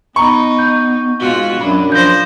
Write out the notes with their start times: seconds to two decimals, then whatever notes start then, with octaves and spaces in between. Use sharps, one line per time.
0.16 B3 D#4 A#5 B5 C#6
0.59 G6
1.20 G#2 F4 F#4
1.61 F#2 D4 B5
1.92 F3 D4 C5 G6 A#6